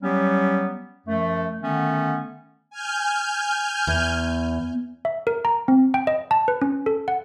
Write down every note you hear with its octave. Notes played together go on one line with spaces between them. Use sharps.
F#3 G3 B3 C#4 G4
F#2 F3 A3
D3 D#3 A3 B3 C#4
G#5 F6 G6
E2
E5
A#4
A#5
C4
G5
D#5
A5
B4
C#4
A4
F#5